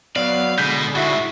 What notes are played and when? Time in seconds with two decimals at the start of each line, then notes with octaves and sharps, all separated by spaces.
0.16 F#3 B3 D5 F5
0.58 B2 D3 G#3 B5 G6
0.95 G#2 C3 E4 F#4